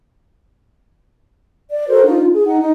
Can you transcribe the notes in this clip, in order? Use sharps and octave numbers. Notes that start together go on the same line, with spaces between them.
D5
F#4 A4 A#4 C5
D4 D#4 F4
G#4
D#4 F#5
D#4